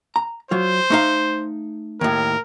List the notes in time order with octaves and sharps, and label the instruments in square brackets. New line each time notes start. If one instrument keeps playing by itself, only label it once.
[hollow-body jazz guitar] A#5
[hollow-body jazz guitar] F#3 F4 [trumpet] C5
[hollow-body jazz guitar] A3 D#4 F5
[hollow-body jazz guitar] D#2 A2 [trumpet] A#4